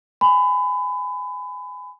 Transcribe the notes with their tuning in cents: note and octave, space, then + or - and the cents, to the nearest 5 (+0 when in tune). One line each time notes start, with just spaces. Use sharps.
G#5 +0 B5 +30